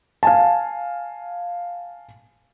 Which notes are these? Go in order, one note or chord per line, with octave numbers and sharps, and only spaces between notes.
F5 G#5 A5